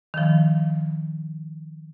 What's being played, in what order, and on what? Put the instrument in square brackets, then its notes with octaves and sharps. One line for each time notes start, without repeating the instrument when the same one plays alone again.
[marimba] D#3 F3